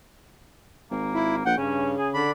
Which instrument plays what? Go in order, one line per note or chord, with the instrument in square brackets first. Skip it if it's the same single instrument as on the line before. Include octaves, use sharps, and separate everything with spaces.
[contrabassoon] G#1 [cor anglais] A#3
[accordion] E4
[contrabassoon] A#1 [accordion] F#5 [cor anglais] G5
[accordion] G2 [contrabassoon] C#3 [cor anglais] C#4
[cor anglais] G#4
[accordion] D3 B5 [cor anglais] D4